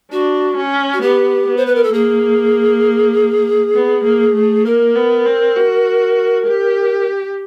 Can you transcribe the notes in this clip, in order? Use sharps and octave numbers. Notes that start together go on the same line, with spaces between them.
D4 F#4
C#4
F#4
B3 G4
B3
C5
B4
A#4
A4
A#3 G#4
B3
A#3
A3
A#3 A#4
B3
C4
F#4
G4